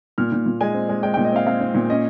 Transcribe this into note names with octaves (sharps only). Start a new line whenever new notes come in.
A#2 F6
A#2
A#2
G#3 G#5
C4
G#3
G#3 G5
A#2 G5
D#5
C4 F5
C4 F5
C4
A#2
C#4 D#5